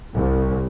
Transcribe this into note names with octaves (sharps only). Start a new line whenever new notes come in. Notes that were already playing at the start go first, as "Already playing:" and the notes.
C2